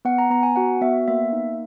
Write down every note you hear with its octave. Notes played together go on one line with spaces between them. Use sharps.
B3 F#5
A#5
B3 A#5
G#5
F#4 F#5
B3 E5
A#3 E5
D#4